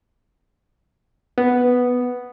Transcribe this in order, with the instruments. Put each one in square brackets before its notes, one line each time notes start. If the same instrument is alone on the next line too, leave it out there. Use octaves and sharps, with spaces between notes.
[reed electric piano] B3